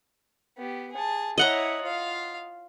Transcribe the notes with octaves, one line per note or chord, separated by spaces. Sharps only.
B3 G4
G#4 A5
E4 C#5 D#5 F#5 A#5
F4 F5